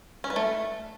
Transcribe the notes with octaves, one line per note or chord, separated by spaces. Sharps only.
C#4
B4
A3